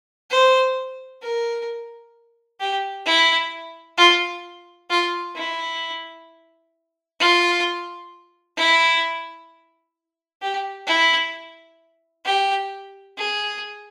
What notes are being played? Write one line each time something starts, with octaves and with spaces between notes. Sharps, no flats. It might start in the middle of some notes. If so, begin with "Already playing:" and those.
C5
A#4
G4
E4
F4
F4
E4
F4
E4
G4
E4
G4
G#4